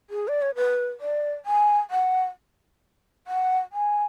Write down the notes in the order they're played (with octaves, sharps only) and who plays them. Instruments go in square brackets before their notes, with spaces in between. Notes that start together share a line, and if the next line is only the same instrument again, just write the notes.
[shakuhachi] G#4
D5
C#5
B4
D5
G#5
F#5
F#5
G#5